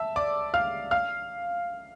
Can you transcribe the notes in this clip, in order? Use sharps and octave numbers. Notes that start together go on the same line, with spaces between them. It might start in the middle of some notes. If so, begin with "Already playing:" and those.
Already playing: E5 A5 E6
D5 D6
F5 F6
F5 F6